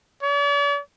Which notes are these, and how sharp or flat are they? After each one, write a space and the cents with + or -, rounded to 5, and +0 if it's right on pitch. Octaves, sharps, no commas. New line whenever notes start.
D5 -45